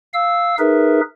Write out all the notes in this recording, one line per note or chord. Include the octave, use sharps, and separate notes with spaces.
F5 E6
D#4 G#4 A#4 B4 E5